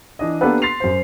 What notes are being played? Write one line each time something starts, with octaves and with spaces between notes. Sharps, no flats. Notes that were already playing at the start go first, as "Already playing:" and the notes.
E3 D4 D#5
A#3 B3 D4 G4 A4 B4
C6 A6 B6 C7 F7
F#2 C5